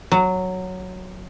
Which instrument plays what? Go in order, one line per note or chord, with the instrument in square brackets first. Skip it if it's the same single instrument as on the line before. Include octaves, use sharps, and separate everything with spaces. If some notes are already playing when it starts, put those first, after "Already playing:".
[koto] F#3